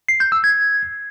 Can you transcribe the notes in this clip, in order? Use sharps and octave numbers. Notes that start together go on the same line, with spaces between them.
C7
G6
E6
G#6